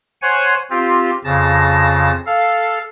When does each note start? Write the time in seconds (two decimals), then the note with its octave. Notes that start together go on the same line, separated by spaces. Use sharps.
0.22 C5 C#5 F#5 G#5
0.70 C4 F4 G4
1.24 F2 C#3 A5 A#6
2.26 A4 F5